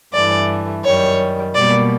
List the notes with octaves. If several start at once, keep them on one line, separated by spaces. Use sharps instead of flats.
G2 E3 A3 D5
F#2 D#3 G3 C#5
B2 G3 A#3 D5